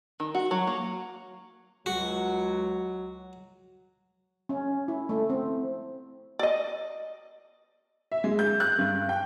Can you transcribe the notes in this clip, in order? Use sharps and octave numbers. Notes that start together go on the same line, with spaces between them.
D#3
F#4
F#3
A#3
C#2 F#3 F#4
C#4
E4
A3
C4
D5 D#5
E5
G#3
G6
F#6
G2
G5